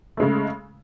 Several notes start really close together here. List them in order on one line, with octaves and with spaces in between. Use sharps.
A3 G#3 C#3